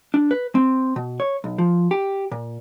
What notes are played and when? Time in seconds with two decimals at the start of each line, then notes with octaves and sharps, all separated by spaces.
0.14 D4
0.31 B4
0.55 C4
0.96 B2
1.20 C#5
1.44 B1
1.58 F3
1.91 G4
2.32 A#2